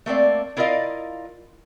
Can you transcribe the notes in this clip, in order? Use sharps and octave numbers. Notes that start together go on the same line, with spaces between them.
A3 A#3 C4 D5
E4 F4 A#4 D5 D#5 F5